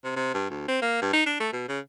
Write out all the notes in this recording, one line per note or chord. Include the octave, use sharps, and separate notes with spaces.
C3
C3
G2
D2
C4
A#3
G2
D#4
D4
A3
B2
C#3